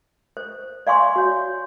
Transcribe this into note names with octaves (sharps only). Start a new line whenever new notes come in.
C5
D5 F5 G#5 C6 C#6
F#4 C#5